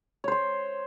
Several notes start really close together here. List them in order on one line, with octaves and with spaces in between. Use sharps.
C#5 C5 C6